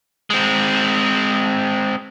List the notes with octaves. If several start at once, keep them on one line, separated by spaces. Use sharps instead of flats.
G#3 C4